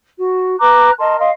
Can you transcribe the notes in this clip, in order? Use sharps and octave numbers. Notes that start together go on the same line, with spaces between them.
F#4
B4 A#5 D6 F#6
A#4 D#5 A5 C6
D#5 F5 C6